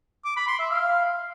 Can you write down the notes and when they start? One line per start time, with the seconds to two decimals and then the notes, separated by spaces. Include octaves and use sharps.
0.25 D6
0.36 B5
0.48 C6
0.59 E5
0.71 F5